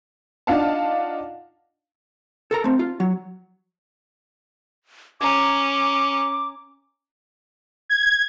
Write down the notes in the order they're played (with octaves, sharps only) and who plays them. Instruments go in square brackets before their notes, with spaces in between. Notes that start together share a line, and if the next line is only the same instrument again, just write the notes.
[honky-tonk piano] D4 D#4 F4 F5 F#5 A5
[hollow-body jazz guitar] A4 A#4 A#5
A3 C4
F4
F#3
[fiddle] C#4 [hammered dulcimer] G#5 A#5 [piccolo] D6
[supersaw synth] G#6